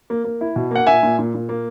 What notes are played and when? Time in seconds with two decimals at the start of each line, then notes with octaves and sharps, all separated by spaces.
0.10 A#3
0.24 A#3
0.41 E4
0.56 B2
0.71 A#3 F#5
0.87 A#2 E5 G#5
1.03 A#2
1.19 A#2
1.34 A#2
1.49 A#3